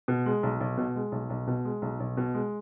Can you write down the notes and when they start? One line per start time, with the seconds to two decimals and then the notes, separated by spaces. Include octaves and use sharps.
0.08 B2
0.26 G#3
0.43 B1
0.61 B1
0.77 B2
0.96 G#3
1.12 B1
1.30 B1
1.47 B2
1.65 G#3
1.82 B1
2.00 B1
2.17 B2
2.34 G#3